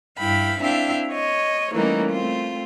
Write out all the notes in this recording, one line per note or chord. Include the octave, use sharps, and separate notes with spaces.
G2 E4 F5 G5 B5
C4 D4 E4 E5 F5 G5
C#5 D#5
E3 G3 A3 A#3 C#4 D#4
A3 C4 F4